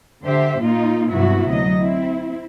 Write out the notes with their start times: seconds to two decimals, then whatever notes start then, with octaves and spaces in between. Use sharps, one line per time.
0.23 D3 G4 C5 E5
0.60 A#2 A#3 D#4 F4
1.11 G2 C3 F#3 B3 E4 F#4
1.48 D2 F#3 D#5
1.77 C4 E4